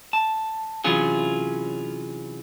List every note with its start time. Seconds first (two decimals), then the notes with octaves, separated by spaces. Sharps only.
0.13 A5
0.84 C3 E3 F#3 C#4 F4 G#4